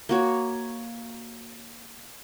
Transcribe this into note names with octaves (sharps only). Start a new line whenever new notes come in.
A#3 F#4 C#5